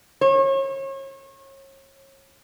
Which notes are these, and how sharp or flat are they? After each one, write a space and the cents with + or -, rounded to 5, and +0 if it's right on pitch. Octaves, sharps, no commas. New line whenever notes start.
C#5 -35